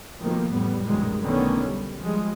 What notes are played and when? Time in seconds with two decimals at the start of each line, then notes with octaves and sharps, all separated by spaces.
0.21 B2 D#3 F3 A3 A#3
0.51 A1 F2 A2 G3 B3
0.85 A#1 F#2 B2 D#3 G3 G#3
1.21 B1 D3 D#3 A3 B3 C#4
1.62 G3
1.99 F3 G3 G#3